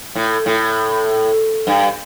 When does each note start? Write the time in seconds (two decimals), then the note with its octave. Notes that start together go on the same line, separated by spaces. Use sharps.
0.15 A2
0.46 A2
1.67 G2